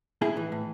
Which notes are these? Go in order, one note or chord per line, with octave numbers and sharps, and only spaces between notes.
A2 E4 G#4
E3
A2